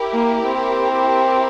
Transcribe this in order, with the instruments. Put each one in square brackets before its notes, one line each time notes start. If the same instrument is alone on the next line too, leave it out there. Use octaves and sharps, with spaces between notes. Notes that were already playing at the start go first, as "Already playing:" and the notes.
Already playing: [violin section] E4 G4 A#4
[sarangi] A#3
C4